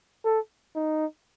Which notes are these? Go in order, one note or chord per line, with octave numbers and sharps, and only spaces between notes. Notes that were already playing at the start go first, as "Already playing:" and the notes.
A4
D#4